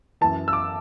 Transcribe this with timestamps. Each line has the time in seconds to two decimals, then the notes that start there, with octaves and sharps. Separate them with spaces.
0.21 F#2 E3 A5
0.48 E6
0.53 D6